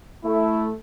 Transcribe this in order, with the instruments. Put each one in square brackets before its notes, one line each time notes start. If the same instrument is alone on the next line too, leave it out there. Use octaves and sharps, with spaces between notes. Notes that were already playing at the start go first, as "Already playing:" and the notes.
[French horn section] A3 [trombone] E4